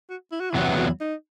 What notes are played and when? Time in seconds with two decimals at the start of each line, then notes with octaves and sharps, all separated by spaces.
0.09 F#4
0.31 E4
0.40 F#4
0.50 E4
0.54 E2 C3 F#3 B3 F#4
0.68 E4
0.77 F#4
0.85 E4
1.00 D#4